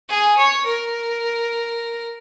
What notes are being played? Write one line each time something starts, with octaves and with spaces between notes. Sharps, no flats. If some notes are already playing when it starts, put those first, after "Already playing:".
G#4
C#5
A#4